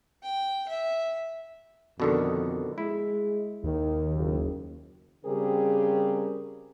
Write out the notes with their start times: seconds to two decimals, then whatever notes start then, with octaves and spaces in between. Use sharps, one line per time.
0.23 G5
0.68 E5
2.00 F2 B2 D3 D#3
2.78 G#3 E4
3.64 D#2 D#3
4.15 F#1
5.26 C#3 G3 C4 G4 G#4 A#4